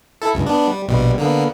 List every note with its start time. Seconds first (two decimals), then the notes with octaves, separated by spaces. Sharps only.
0.22 E4 A4
0.34 C#2 G2
0.46 B3 D4
0.67 G3
0.88 A#1 B2 G3
1.18 D3 A#3 B3